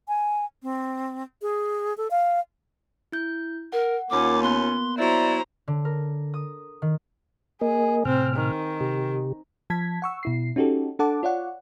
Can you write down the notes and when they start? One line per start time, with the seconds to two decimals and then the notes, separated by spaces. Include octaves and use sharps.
0.08 G#5
0.63 C4
1.42 G#4
1.97 A4
2.11 F5
3.12 E4 G6
3.72 A#4 F#5
4.10 D#2 A#3 C#4 F4 D6
4.42 B3 B5 C6 F#6
4.97 F#3 E4 C5 D5 A#5
5.68 D3
5.85 A#4
6.34 D#6
6.82 D#3
7.61 A#3 G#4 A#4 D#5
8.05 A2 C3 C4 F6
8.36 D#3
8.81 C3 G4
9.70 F3 A5 G#6 B6
10.02 F#5 C#6 E6
10.23 B2 E4 C7
10.56 C#4 D#4 F#4 G4 A4
10.99 D4 A4 F#5 A5 D6
11.23 F4 C#5 D5 F#5